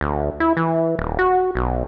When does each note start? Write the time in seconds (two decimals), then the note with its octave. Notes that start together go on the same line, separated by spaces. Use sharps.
0.01 D2
0.40 E4
0.57 E3
0.99 D#1
1.19 F#4
1.55 B1